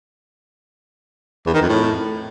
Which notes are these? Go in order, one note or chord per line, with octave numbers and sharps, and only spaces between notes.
E2
D#3
F2
A2